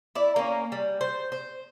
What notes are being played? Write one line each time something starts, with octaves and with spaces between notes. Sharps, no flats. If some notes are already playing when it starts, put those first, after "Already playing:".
E4 D5
A#3 C#4
G3
C5
C5